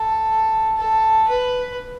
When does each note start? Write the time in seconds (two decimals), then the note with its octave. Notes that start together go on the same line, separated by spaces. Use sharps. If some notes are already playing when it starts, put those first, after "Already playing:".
Already playing: A4
0.77 A4
1.28 B4